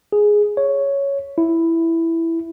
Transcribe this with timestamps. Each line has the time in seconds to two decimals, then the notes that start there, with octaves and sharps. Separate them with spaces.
0.13 G#4
0.57 C#5
1.38 E4